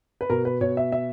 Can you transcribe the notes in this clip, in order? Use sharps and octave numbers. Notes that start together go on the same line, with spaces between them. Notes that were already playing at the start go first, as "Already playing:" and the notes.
B4
B2 A#4
B4
B2 C#5
E5
E5